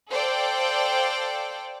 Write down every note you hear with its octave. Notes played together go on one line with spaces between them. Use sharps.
A4 C5 D5 F5 G5